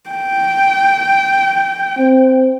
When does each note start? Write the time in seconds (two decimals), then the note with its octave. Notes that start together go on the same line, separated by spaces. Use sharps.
0.10 G5
1.98 C4